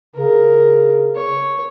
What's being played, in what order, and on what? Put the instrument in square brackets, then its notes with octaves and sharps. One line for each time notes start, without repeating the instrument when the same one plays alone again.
[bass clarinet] C#3 [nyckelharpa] A#4
[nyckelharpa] C#5